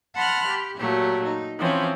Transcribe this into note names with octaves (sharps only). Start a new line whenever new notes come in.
F#5 A5 B5 C6 F6 F#6
G4
A#2 F#3 A3 G4
D#4
E3 F3 C4 C#4